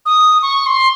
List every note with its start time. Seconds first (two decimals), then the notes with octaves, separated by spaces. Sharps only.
0.06 D#6
0.42 C#6
0.66 C6